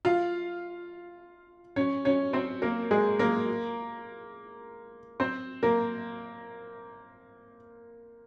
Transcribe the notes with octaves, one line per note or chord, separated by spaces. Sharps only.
F4 F5
C#4 C#5
C#4 C#5
C4 C5
A#3 A#4
G#3 G#4
A#3 A#4
C4 C5
A#3 A#4